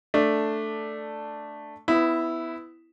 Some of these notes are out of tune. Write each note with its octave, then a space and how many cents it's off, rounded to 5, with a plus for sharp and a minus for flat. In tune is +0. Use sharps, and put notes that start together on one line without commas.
A3 +5 D4 +5
B3 +25 E4 +0